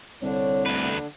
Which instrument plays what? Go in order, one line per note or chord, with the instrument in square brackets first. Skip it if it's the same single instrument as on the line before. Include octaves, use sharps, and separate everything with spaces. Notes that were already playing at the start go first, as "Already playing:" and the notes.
[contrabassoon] C2 [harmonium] D3 D4 [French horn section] C#5
[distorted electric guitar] D2 B4 [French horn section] A3